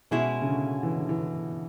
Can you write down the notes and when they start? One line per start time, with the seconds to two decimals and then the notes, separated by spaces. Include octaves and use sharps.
0.11 B2 G#3 C#4 E4 G#4
0.42 C#3
0.47 D3
0.83 E3
0.96 D3
1.09 E3